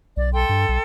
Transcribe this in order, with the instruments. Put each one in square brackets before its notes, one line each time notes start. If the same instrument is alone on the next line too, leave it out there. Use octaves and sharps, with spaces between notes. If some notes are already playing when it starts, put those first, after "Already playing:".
[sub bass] B1 [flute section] D5
[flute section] A4 G5 C6
[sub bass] G2
B1